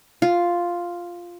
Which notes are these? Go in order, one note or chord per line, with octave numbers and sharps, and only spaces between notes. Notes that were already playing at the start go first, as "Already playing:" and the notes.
F4